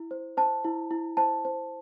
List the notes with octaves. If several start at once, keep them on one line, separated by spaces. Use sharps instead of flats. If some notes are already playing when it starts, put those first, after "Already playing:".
Already playing: E4
C5
C5 A5
E4
E4
C5 A5
C5